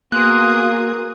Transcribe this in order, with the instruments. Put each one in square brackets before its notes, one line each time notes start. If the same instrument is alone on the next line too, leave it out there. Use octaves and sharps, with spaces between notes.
[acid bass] A#3 [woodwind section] B3 C6 [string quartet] F#4 G#4 D#6 [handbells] F#6